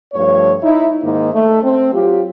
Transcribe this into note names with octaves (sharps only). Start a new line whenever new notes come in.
G2 F3 A3 C#5
D#4 E4
G#2 D#3 A#3 D#4
A3
C4
F#3 F4 G4